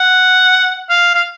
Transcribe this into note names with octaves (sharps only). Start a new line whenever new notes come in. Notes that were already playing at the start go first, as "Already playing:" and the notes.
Already playing: F#5
F5
F5